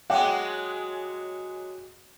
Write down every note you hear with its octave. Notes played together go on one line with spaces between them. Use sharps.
F#3 G#3 F#5 G5 D6